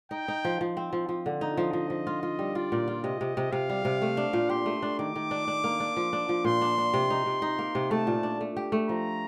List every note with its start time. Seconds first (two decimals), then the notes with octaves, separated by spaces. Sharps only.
0.11 D#4 G5
0.28 D#4
0.45 F3
0.61 F3
0.77 C4
0.93 F3
1.09 F3
1.26 D3
1.41 D#4
1.57 F3 D#5
1.73 F3
1.90 F3
2.07 F4
2.23 F4
2.39 G3
2.55 F4 D5
2.72 A#2
2.88 F4
3.04 C3 D#5
3.21 C3
3.37 C3
3.52 C3 F5
3.69 G3
3.85 C3
4.02 A3
4.17 D4
4.33 A#2
4.49 G4 C6
4.66 A3
4.82 D4
4.99 D#3 D6
5.16 D#3
5.31 D4
5.48 D4
5.64 A#3
5.80 D4
5.96 F3
6.13 D4
6.29 F3
6.44 A#2 C6
6.61 D4
6.78 D4
6.94 C3
7.10 D#4
7.26 C3
7.42 D#4
7.59 A#3
7.75 C3
7.91 A3 A5
8.07 A#2
8.23 D4
8.41 A3
8.57 G4
8.72 A3
8.89 F3 A#5